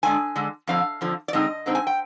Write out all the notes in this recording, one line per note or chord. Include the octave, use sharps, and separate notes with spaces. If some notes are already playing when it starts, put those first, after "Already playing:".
D3 G#3 D4 G#5
D3 G#3 D4
F2 D3 F3 F5
F2 D3 F3
D5
D3 G#3 C4 D#4 D#5
D3 G#3 C4 D#4
G#5
G5